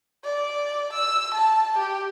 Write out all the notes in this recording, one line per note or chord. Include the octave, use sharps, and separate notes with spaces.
D5
E6
A5
G4